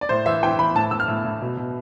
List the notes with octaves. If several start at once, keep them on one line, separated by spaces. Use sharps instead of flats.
D5
A2 C5
E3 E5
E3 G5
E3 B5
A2 A5
A2 E6
F6
A2
A2
B2
B2